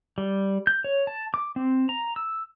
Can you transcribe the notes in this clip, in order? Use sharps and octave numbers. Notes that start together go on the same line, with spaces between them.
G3
G6
C#5
A5
D6
C4
A#5
E6